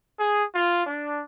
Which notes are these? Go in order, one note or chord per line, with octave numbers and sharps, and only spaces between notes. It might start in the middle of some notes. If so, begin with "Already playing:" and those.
G#4
F4
D4